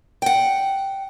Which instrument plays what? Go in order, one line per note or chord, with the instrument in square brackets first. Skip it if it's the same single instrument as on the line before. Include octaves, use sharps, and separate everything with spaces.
[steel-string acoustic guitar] F#5 G5